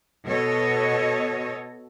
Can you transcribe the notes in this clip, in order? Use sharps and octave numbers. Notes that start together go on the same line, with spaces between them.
B2 A4 C#5 D#5